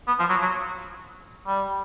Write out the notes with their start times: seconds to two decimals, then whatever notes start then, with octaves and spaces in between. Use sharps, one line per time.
0.07 B3
0.19 F3
0.30 F#3
0.42 F#3
1.47 G3